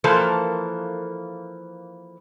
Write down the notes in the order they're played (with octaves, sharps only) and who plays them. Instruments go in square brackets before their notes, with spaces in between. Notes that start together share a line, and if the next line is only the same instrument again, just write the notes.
[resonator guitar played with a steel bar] E3 F3 A#3 A4 A#4 C5